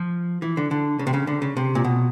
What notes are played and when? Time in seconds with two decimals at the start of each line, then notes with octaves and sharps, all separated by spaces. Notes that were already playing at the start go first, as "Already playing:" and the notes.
Already playing: F3
0.42 E3
0.57 D3
0.71 D3
0.99 C#3
1.07 C3
1.14 C#3
1.27 D3
1.42 C#3
1.57 C3
1.75 A#2
1.85 B2